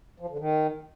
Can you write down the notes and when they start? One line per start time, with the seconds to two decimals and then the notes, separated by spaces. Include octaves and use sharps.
0.20 F3
0.29 D3
0.39 D#3